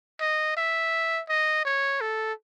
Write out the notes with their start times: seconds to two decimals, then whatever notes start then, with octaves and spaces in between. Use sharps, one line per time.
0.21 D#5
0.57 E5
1.29 D#5
1.65 C#5
2.01 A4